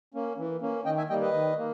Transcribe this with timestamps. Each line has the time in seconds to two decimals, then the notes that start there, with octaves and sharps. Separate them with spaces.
0.14 A#3 C#4
0.38 E3
0.61 A#3 C#4
0.85 D#3 D#5 G5
0.98 E5 G#5
1.09 G3 A#3 D#5 G5
1.21 B4 D#5
1.33 D#3
1.58 A#3